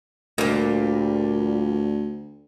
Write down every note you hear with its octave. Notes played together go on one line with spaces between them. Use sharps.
D2 A#2 G3